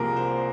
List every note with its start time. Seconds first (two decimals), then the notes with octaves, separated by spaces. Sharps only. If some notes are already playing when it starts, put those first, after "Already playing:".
Already playing: C2 C3 F3 A#3 G#4 A#4
0.16 C5